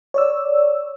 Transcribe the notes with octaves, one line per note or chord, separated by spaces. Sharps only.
C#5 D5 E6